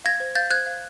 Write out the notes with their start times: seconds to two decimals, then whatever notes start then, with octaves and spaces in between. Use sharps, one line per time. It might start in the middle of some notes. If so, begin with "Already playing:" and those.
0.05 F5 G#6 A#6
0.20 C5
0.35 F5 G6 A6
0.50 C5 F#6 G#6
0.66 F5